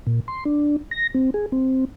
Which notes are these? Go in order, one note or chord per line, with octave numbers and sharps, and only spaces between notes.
A#2
C6
D4
A#6
C4
G#4
C4